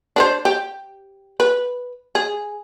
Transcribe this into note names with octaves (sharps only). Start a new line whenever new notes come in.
D4 B4 C5
G4
B4
G#4